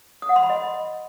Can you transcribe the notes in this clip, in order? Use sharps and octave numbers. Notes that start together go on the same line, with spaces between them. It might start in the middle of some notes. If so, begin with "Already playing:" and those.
D#6
F#5
C6
B5
D#5